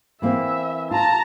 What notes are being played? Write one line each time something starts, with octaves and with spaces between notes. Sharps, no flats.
E3 A#3 C4 E5
F4 A5 A#5